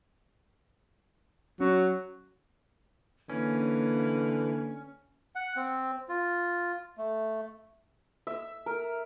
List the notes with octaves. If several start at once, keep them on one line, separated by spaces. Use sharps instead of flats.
F#3 C#4
D3 E3 A#3 C#4
F#5
C4
F4
A3
E5
A#4